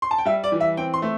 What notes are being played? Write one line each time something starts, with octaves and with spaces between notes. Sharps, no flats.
C6
A5
G5
G3 E5
D5
E3
E5
C4 G5
C6
A3